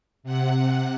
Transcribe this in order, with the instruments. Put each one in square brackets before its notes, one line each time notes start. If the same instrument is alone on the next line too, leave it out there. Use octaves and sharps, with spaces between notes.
[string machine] C3 F#5